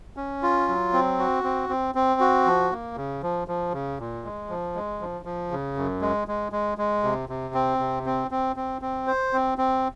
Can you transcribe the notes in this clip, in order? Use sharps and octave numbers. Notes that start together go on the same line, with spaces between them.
C#4
F4
F#3
C4
F#4
C4
C4
C4
F#4
F3
A#3
C#3
F3
F3
C#3
A#2
G#3
F3
G#3
F3
F3
C#3
F#2
G#3
G#3
G#3
G#3
C3
C3
C4
C3
C4
C4
C4
C4
C5
C4
C4